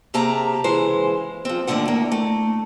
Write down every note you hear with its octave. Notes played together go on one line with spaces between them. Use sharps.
C3 A#3 G4 G#4 A5 A#5
C#3 E3 G#3 C5
F3 C4
D#2 A2 D3 D#3 F#5
A2 A#3
A3